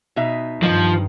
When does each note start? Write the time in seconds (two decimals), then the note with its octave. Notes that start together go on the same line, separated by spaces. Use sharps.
0.16 B2 D#4 E5
0.63 G2 D#3 F3